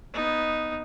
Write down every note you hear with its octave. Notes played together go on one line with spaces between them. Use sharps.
B3 D#4